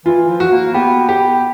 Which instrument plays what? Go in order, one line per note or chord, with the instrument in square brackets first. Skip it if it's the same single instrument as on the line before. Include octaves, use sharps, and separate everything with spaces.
[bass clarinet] E3 [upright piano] F4
[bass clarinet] F3
[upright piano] F#4
[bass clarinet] A#3
[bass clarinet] B3 [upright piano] G4
[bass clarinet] B3 [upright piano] G4